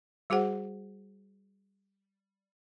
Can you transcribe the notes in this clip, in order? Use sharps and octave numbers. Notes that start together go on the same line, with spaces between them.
G3 F#4 G#4 C5 F#5